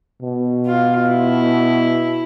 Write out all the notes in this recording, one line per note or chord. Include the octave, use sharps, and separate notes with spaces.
B2
F4
E4